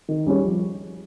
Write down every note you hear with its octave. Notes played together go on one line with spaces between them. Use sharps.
D#3
G3 C#4 G#4 C#5
F3